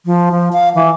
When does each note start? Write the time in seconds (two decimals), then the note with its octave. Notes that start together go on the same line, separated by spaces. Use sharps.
0.06 F3
0.31 F3
0.53 F5
0.75 E3